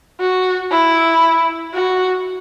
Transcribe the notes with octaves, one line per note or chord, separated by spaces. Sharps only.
F#4
E4
F#4